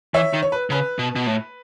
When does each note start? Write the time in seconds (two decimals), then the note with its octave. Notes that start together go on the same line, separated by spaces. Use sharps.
0.14 E3 C#5 E5
0.34 D#3
0.42 C#5
0.52 B4
0.70 C#3 B4
0.99 B2
1.16 B2
1.27 A2